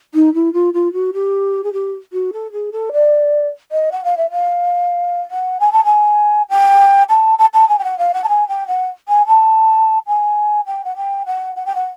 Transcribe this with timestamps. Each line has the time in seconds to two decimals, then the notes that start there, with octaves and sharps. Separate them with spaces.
0.14 D#4
0.34 E4
0.53 F4
0.73 F4
0.93 F#4
1.13 G4
1.64 G#4
1.73 G4
2.13 F#4
2.33 A4
2.52 G#4
2.72 A4
2.93 D5
3.72 D#5
3.92 F#5
4.04 F5
4.17 E5
4.31 F5
5.31 F#5
5.60 G#5
5.72 A5
5.84 G#5
6.50 G5
7.09 A5
7.38 A5
7.54 A5
7.69 G#5
7.79 G5
7.84 F#5
7.98 F5
8.14 F#5
8.24 A5
8.29 G#5
8.49 G5
8.68 F#5
9.08 G#5
9.27 A5
10.07 G#5
10.66 G5
10.85 F#5
10.96 G5
11.26 F#5
11.56 F#5
11.66 G5
11.75 F#5